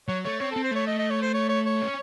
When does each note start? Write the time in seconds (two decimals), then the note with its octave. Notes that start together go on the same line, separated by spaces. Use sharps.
0.08 F#3 C#5
0.24 A3 C#5
0.40 C4 C#5
0.52 A4
0.56 C4
0.64 C5
0.71 A3 C#5
0.87 D#5
0.99 D#5
1.10 C#5
1.22 C5
1.34 C#5
1.49 C#5
1.66 C#5
1.81 C#4